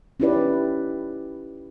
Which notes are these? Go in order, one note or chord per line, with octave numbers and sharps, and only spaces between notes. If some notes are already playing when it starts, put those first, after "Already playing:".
C#4 D#4 E4 G4 B4 D5